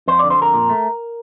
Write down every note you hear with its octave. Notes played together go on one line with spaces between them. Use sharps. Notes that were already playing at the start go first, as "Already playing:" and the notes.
F2 C5
D3 D5
C5
F2 A#4
A#2
A3